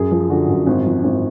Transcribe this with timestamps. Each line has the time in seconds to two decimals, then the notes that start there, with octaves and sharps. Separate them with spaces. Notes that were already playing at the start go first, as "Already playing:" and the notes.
Already playing: F#2 G#4
0.11 F3
0.30 D3 F#4
0.49 F#2
0.67 G#1
0.85 F3
1.04 G#1